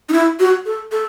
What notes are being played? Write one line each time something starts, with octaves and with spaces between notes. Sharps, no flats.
D#4
E4
F#4
A4
A4